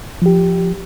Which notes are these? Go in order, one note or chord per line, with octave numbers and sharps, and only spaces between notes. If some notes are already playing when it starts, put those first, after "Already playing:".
F3 G4